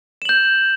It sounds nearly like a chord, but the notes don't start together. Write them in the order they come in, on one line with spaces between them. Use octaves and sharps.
E7 F#7 G6